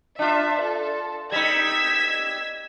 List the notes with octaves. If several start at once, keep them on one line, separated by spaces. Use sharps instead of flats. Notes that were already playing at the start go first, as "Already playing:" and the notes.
D4 F4 E5
A4
G3 D#4 E6 G#6 B6